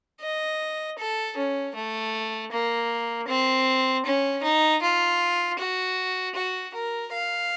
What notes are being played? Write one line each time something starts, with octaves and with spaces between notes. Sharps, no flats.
D#5
A4
C#4
A3
A#3
C4
C#4
D#4
F4
F#4
F#4
A#4
F5